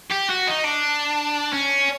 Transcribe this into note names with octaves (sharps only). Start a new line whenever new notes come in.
G4
F#4
D#4
D4
C#4